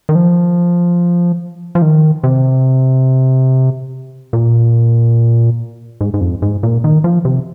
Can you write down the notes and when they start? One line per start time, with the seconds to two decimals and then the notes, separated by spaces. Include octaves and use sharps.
0.09 D#3
0.15 F3
1.75 F3
1.82 D#3
2.24 C3
4.33 A#2
6.01 G#2
6.14 G#2
6.21 F2
6.42 G#2
6.63 A#2
6.84 D#3
7.04 F3
7.25 C3